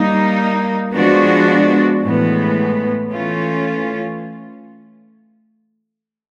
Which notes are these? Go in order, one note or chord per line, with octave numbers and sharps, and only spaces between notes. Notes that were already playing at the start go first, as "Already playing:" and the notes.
Already playing: G3 A#3 D#4
F3 G#3 B3 D4 F#4
A2 E3 G#3 B3
E3 A3 C#4 F4